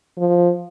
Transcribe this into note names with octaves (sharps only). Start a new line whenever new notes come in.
F3